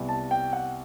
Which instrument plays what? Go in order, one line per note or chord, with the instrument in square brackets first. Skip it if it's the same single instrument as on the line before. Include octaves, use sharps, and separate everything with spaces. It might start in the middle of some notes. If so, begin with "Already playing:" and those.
Already playing: [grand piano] C2 C3 G3 B3
A5
G5
F#5